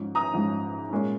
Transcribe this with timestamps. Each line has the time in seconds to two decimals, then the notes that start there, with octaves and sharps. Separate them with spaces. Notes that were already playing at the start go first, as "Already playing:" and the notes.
Already playing: G#2 F3 C#4
0.15 A#5 D#6
0.33 G#2 F3 C#4
0.91 A#2 G#3 C#4